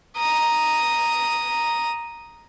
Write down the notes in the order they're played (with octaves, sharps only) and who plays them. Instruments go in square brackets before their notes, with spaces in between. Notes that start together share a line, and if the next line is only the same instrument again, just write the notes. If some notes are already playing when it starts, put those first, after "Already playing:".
[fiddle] A#5 D#6